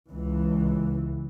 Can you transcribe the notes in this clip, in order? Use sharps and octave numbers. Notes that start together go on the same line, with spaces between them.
C#2 E3